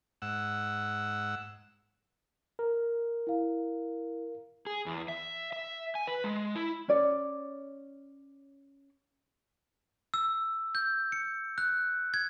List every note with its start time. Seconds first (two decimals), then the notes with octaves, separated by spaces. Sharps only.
0.22 G#2 F#5 E6
2.59 A#4
3.27 E4 F5
4.67 G#4
4.86 E2
5.08 E5
5.53 E5
5.95 G#5
6.07 B4
6.24 G#3
6.55 E4
6.88 C#4 C#5 D5
10.14 E6
10.75 G6
11.12 C#7
11.58 F#6
12.14 G#6